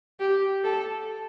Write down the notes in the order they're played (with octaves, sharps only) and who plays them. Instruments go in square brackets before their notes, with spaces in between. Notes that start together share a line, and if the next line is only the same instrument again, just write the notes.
[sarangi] G4
A4